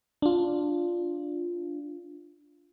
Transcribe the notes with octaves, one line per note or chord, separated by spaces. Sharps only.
D4 F4